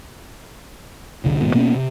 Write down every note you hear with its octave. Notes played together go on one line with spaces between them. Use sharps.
F1 C2 D3
D#1 D#2 G#2 B2
B2 A#3 B3 C#4
C3